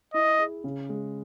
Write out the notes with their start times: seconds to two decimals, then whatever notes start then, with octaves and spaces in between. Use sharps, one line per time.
0.14 E4 D#5
0.39 G#4
0.64 C#3
0.89 G#3